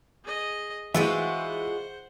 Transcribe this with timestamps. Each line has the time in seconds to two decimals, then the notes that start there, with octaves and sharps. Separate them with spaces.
0.24 G#4 D#5
0.94 E3 G#3 F4 F#4 G#4 C5 E5 F#5